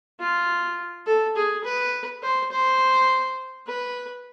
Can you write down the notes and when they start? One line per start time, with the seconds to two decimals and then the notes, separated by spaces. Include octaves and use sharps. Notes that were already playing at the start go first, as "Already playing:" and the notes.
0.20 F4
1.06 A4
1.36 G#4
1.64 B4
2.23 C5
2.52 C5
3.67 B4